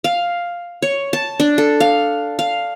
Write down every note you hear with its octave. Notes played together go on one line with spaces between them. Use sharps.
F5
C#5
A5
D4
A4
F5
F5